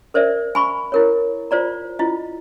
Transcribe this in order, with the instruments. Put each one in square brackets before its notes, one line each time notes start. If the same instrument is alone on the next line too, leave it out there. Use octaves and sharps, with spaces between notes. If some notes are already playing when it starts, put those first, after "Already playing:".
[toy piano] A#4 C5 D5 E5
G#5 B5 C#6
E4 A#4 C#5
F4 C5 D5 A#5
E4 F4 D#5